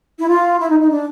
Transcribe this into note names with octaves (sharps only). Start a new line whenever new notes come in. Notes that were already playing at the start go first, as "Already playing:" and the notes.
E4
F4
E4
D#4
D#4
D4